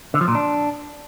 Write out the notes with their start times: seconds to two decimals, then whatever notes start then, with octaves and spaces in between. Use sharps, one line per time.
0.14 D3
0.21 F3
0.28 A#2
0.35 D4